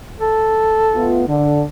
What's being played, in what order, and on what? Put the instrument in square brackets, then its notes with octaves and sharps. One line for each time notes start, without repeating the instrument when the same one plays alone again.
[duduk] A4
[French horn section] A3 B3 F4
D3